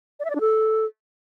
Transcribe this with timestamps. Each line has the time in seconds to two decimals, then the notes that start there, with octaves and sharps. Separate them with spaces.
0.20 D5
0.25 E5
0.30 D5
0.35 D4
0.40 A4